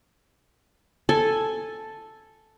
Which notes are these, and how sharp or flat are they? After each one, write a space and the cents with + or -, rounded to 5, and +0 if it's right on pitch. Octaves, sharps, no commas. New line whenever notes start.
A4 +0 G#5 +0